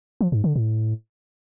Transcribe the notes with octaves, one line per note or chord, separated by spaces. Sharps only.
F3
G#2
D3
A2